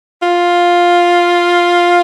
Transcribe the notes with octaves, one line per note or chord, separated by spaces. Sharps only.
F4